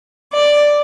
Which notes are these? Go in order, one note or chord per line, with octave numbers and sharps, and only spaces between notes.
D5